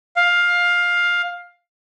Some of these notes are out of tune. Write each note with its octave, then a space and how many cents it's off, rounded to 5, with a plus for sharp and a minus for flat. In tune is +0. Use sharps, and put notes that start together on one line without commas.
F5 +15